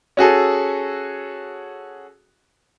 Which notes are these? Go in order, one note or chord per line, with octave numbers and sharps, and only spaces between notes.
C#4 F#4 G#4 A4